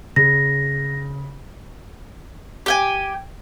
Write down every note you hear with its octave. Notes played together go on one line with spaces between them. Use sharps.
C#3 A#6
G4 G5 G#5